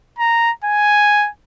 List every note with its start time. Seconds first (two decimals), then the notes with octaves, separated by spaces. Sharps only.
0.19 A#5
0.64 G#5